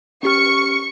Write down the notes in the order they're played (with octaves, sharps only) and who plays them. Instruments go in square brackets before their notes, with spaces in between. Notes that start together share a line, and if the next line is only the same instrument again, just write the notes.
[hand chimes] C#4 G4 F6 [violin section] C#6 C#7